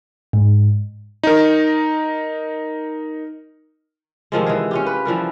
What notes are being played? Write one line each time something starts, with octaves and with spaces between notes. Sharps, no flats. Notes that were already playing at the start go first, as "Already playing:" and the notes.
G#2
D#4 A#4
C3 D#3 F3 G#3
E3 G#3 G#4
C#4 F4 G4
B4
E3 F3 G3 A#4